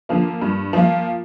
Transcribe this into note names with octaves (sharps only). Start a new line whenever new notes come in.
D3 F3 A#3
G2
F3 A#3 F4